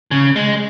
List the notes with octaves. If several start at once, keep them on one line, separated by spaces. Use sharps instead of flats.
C#3
G#3